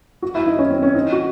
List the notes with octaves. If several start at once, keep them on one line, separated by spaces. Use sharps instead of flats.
F#4
E4
D#4
C#4
C4
C#4
D#4
F#4